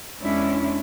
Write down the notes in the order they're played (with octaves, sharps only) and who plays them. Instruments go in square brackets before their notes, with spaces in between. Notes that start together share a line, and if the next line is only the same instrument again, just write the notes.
[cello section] E2 G#3 C#4 D4 E4